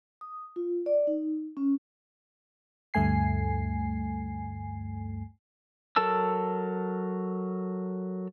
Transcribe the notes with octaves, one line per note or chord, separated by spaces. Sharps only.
D#6
F4
D5
D#4
C#4
D2 G2 A3 G#5 C7
F#3 A4 A#4 A5 E6